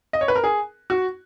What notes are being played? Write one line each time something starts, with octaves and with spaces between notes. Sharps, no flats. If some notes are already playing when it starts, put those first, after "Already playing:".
D#5
C#5
B4
A#4
G#4
F#4